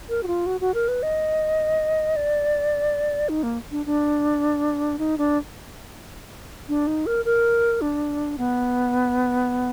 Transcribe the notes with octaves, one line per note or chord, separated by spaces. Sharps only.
A#4
F#4
F4
F#4
F#4
A#4
B4
D#5
D5
D#4
A#3
D4
D4
D#4
D4
D4
D#4
A#4
A#4
D4
B3